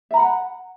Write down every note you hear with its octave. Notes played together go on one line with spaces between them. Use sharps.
E5 F#5 A#5 B5